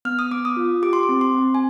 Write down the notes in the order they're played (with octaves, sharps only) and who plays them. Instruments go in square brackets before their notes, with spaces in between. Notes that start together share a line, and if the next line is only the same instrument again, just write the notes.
[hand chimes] B3 F6
D#6
B3 D6
D#6
F4
G4 D6
C6
D6
C4
C6
C4
G#5